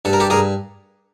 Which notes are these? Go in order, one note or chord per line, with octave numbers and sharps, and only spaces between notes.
G2 A4
A#4
G4 A4
G2 G#4 A#4